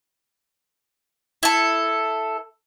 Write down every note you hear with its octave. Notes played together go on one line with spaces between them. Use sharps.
E4 A4